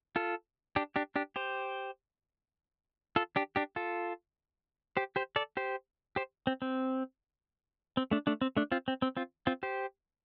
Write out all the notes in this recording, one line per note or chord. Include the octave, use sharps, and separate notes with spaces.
F4 A4
D4 G4
D4 G4
D4 G4
G4 C5
F4 A4
D4 G4
D4 G4
F4 A4
G4 C5
G4 C5
A4 D5
G4 C5
G4 C5
C4
C4
C4
A3 D4
A3 D4
C4
A3 D4
C4 F4
C4
C4
C4 F4
C4 F4
G4 C5